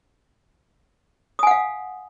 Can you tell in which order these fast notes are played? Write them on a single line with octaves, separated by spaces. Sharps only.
D#6 G#5 F#5 F5